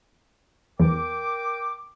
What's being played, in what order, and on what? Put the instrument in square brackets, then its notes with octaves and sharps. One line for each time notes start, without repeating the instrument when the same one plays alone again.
[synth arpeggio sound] E2 [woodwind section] A#4 G5 D6